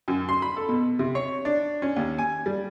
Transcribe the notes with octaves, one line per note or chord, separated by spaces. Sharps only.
F#2
C6
B5
A4
B2
C3
C#5
D4
C#4
D#2
G#5
G3